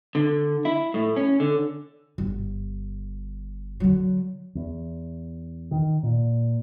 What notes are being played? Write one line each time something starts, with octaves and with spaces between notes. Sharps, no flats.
D3
E4
A2
C#4
D3
G1
D3 F#3
E2
D#3
A#2